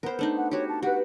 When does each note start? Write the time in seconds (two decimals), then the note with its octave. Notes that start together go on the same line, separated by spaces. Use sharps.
0.03 B3 A#4 C5 B5
0.19 A3 D4 D#4
0.37 F#5
0.51 F#4 G4 C#5
0.69 A5
0.83 F#4 G4 B4 F#5